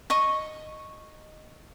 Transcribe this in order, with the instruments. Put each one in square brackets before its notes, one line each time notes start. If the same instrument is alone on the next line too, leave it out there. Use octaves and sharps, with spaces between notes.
[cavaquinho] D#5 C#6 D#6